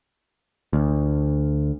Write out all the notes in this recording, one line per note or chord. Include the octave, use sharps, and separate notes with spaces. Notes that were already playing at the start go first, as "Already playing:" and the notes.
D2